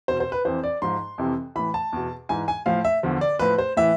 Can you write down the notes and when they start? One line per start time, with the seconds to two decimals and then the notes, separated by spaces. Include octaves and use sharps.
0.08 E2 B2 C5
0.20 C5
0.32 B4
0.45 F2 E3 C5
0.64 D5
0.82 G#2 F3 C6
1.18 F2 C3 E3
1.56 A2 E3 B5
1.74 A5
1.93 E2 B2
2.29 G#2 E3 G#5
2.48 G#5
2.66 A2 F3 F5
2.85 E5
3.03 E2 D3 F3
3.21 D5
3.39 A2 F3 B4
3.58 C5
3.77 A2 E3 E5